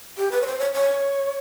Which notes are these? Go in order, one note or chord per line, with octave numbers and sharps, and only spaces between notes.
G4
B4
C#5
C5
C#5
C#5